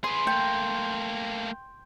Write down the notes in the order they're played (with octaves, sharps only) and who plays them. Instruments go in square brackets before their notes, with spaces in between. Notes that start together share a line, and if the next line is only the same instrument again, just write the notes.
[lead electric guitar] G#4 B4 [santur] C6
[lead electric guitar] A3 A#3 [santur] G5